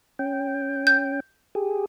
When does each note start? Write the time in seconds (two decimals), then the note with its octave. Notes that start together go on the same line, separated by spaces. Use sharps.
0.19 C#4 G5
0.87 G6
1.55 G4 G#4